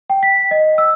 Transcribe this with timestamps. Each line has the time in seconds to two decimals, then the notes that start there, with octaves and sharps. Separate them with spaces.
0.10 G5
0.23 B6
0.51 D#5
0.78 E6